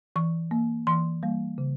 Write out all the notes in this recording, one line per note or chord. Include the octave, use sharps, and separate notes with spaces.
E3 C#6
A#3
E3 C6
G3 A#3
C#3